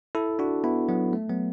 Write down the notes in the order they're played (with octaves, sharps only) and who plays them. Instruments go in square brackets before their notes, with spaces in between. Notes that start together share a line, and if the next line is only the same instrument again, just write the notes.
[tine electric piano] E4 A4
D4 F#4
B3 E4
F#3 B3
A3
F#3 B3